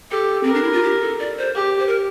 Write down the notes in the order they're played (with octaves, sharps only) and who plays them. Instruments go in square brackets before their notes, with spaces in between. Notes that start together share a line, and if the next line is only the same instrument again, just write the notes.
[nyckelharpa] G4 [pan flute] A4
[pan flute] C4 [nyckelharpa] A#4
[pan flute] D4
E4
F4
G4
A4
D5
C5
[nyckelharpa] G4
[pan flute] C5
A#4